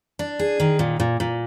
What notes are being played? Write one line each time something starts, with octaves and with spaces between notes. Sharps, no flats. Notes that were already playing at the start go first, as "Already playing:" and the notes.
D4
G#4
D#3
A#2
A#2
A#2